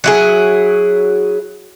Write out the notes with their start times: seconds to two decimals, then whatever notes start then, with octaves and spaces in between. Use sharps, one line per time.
0.04 F#3 E4 G#4